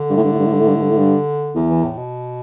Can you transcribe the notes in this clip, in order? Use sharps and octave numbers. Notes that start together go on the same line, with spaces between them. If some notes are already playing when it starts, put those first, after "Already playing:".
Already playing: D3
G2
A2
G2
A2
G2
A2
G2
A2
G2
A2
G2
A2
G2
E2
E3
A2
B2